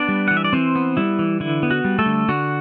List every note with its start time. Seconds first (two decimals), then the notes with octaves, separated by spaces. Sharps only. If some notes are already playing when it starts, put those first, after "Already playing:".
Already playing: B3 D4 D5
0.09 G3
0.28 E3 F#5
0.37 E5
0.44 D5
0.53 E3 C4 C5
0.76 B3
0.97 G3 E4
1.19 E3
1.40 D3 E4
1.63 B3
1.71 F#4
1.84 G3
1.99 A3 A4
2.06 D3
2.28 D3 F#4